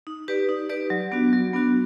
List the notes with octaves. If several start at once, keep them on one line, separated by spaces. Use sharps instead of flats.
D#4
G4 B4 D5
D#4
G4 B4 D5
F#3
B3 D4 F#4
F#3
B3 D4 F#4